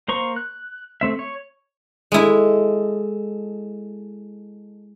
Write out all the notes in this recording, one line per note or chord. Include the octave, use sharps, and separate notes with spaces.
A#3 C5 A#5 C#6
F#6
A3 C4 E5
C#5
G#3 E4 A4 D#5